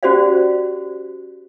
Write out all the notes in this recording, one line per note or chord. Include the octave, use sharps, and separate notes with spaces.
C#4 F#4 G4 C5 D5 F5